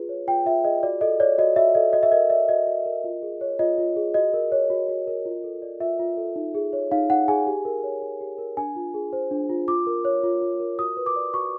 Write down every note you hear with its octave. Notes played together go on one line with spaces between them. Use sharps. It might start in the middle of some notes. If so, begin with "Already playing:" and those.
Already playing: F4 G#4 B4
C#5
F4 G5
F4 E5
G#4 D#5
F#4 D5
A4 D#5
C#5 D5
F#4 D#5
F#4 E5
A4 D#5
F#4 D#5
E5
A#4 D#5
D5 E5
F#4 D#5
F#4
A#4
F4
G#4
C#5
F4 D#5
F4
G#4
F#4 D#5
A#4
C#5
F#4
F#4
A#4
F4
A4
D5
F4 E5
F4
A4
D#4
G#4
C#5
D#4 F5
D#4 F#5
G#4 G#5
G4
A#4
C#5
G4
G4
A#4
D4 G#5
F4
G#4
C5
D4
F4
F4 D6
A#4
C#5
F4
F4
A#4
F#4 D#6
B4
D6
D5
F#4 C#6